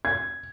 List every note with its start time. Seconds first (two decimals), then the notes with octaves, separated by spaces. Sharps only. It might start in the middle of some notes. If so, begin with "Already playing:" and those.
0.05 G#6